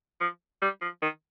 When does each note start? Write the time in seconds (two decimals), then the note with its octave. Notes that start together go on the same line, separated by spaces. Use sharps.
0.21 F3
0.62 G3
0.82 F3
1.02 D#3